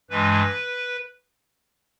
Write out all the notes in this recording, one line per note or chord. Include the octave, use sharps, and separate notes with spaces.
G2 E3 G#3 B4